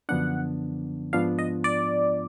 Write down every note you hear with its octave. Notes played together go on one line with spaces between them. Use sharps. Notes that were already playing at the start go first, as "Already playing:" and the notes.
F#2 D3 F3 B3 D4 F#5
G#2 F3 B3 D4 F4 F5
D#5
D5